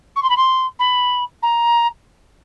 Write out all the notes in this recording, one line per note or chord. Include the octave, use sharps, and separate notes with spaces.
C#6
C6
B5
C6
B5
A#5